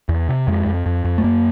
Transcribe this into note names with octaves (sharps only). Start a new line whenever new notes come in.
E2
C3
F2 G#3
F2
F2
F2
A3
F#2 A#3